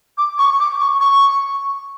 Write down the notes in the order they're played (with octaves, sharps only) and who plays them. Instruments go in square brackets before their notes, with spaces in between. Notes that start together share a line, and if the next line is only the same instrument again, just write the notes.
[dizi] D6
C#6
D6
C#6
C#6